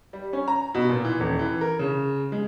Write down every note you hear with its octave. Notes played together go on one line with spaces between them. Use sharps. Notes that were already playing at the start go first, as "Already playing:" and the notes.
G3
C#4
A#5
B2
A#2
E3
D#1
E3
A#4
C#3
G#3